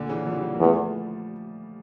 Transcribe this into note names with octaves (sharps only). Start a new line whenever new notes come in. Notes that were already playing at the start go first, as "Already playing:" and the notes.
Already playing: A#2 D3
C#3 E3
D3 F3
E3 G3
A#3
E2 F3 A3